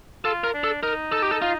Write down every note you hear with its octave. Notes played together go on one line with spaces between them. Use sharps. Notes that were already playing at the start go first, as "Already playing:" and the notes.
F4 A4
A#4
D4
A4
D#4 A#4
A4
G4
A4
F4